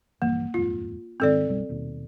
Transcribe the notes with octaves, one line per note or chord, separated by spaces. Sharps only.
A#1 G2 E3 A#3
D#1 F2 G#2 F4
F1 G#2 D#3 C4 A4 D5
F#1 B1 G3
D#1 D#2 B2